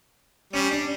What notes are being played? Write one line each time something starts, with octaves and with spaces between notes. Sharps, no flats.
G3 C#4
D4